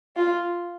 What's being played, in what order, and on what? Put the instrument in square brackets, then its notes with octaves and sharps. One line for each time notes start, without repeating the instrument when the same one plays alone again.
[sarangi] F4